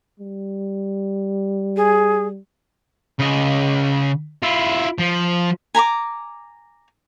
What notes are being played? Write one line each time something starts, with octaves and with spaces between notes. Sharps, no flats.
G3
G#4
C#3 D#5
E4 F4
F3
G#5 A#5 B5 D6